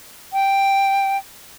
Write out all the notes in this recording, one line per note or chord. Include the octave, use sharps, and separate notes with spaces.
G5